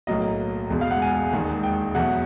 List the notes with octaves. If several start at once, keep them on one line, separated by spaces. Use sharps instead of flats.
B1 A2 F#3 A#3 D#5
E1 E2 B2 G#3
F5
F#5
G#5
E1 D#2 D#3 G#3
G5
E2 B2 F#3 A3 F#5